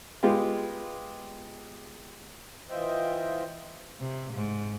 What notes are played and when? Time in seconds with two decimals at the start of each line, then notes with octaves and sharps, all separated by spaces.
0.23 G#3 B3 F4 G4
2.70 E3 F4 C5 D#5 E5 G5
4.00 C3
4.33 G#2